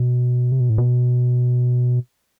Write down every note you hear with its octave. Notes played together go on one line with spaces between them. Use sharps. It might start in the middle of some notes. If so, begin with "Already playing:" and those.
Already playing: B2
C3
B2
A2
B2